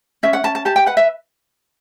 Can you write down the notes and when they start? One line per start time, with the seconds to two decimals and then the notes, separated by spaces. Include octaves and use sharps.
0.23 C#4 E5
0.33 F#5
0.44 C#4 A5
0.55 A5
0.65 G4 A5
0.76 G5
0.86 B4 F#5
0.97 E5